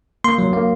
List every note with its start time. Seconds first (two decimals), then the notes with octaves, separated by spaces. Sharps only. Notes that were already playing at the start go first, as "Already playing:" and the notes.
0.24 A#3 C6
0.38 F#3
0.53 A#3